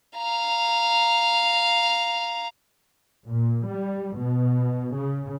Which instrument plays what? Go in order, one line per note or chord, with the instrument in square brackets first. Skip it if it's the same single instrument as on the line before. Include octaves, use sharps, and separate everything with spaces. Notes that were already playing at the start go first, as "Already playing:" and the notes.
[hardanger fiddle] F5 A#5
[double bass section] A#2
G3
B2
C#3